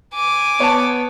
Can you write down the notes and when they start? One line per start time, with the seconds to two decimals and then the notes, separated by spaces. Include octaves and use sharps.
0.14 G#5 D6
0.60 B3 C#5 A5